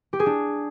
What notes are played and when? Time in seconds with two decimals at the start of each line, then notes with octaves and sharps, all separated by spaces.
0.13 G4
0.20 G#4
0.26 D4